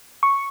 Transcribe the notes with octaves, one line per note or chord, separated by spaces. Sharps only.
C#6